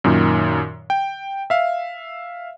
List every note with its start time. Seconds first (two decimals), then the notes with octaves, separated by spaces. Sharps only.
0.04 F#2 A#2 D#3
0.90 G5
1.50 E5 F5